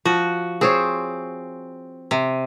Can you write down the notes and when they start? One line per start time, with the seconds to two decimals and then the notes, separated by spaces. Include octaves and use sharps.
0.05 F3 F#4
0.61 C4 G#4 C5 C#5
2.11 C3